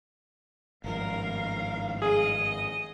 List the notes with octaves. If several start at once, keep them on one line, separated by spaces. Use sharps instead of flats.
G#1 G2 F3 A#4 F5
G#4 D#5